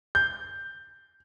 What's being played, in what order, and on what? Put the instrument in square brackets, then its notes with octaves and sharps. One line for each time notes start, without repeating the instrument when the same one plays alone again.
[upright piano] G6